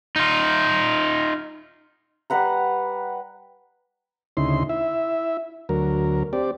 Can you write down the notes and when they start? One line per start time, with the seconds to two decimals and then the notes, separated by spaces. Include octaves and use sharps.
0.16 D#4 F4
2.30 G3 B4 F#5 A#5
4.37 D2 C#3 D#4 E4 C6
4.69 E4 E5
5.69 D2 F#3 A#4
6.33 C4 G4 D5